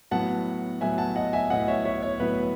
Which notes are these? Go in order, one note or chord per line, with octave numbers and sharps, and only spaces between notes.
A2 F#3 B3 F#5 A5
A2 F#3 B3 E5 G#5
F#5 A5
D#5 F#5
E5 G#5
A2 F#3 B3 D#5 F#5
C#5 E5
C#5 E5
C#5
A2 F#3 B3 B4